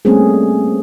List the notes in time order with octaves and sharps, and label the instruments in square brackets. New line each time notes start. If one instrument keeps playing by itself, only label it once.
[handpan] G3 A3 A#3 C4 C#4 G#4